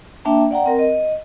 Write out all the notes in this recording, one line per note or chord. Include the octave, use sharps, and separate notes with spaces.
A#3 D4 E5 G5 A5 A#5
D5 F#5 G5 A#5
C4 A#4
D#5